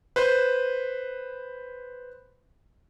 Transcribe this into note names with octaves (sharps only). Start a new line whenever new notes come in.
B4 C5